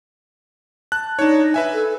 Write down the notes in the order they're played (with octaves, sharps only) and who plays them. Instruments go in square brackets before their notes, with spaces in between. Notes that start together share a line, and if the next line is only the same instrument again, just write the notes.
[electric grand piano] A5 F#6
[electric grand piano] D4 C#5 [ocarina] D#4
[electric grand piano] B4 E5 G#5
[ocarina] A4